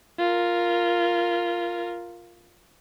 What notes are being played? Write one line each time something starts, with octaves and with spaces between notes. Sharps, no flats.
F4 A#4